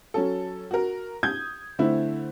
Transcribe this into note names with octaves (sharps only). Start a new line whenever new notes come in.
F#3 C#4 A4
F#4 A#4
D#6 G6 G#6
D3 A3 C4 E4